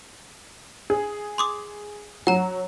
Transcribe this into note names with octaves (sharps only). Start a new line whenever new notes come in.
G#4
C6 D6 D#6
F#3 F#5 A#5